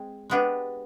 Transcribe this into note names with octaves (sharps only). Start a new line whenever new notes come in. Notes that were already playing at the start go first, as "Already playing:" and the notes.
Already playing: G#3 C4
G#3 B3 D4 G4